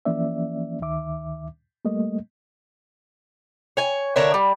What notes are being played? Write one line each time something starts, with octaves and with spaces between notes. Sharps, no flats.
E3 F3 A#3 C#4 D5 E5
D2 D#3 E5 D6
G3 A3 A#3 D#5
C#5 G#5
D3 A#4 C#5 E5
G3